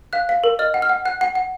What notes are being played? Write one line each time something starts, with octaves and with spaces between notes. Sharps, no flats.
F5 F#6
F5
A#4
D#5 F6
F#5
F6
F#5
F#5 F#6
F#5
F#5